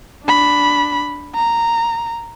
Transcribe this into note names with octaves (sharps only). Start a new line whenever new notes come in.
D4 B5
A#5